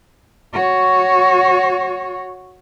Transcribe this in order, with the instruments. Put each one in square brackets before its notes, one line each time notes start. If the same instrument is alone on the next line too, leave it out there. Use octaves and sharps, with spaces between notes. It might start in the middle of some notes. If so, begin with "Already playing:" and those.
[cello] F#4 C#5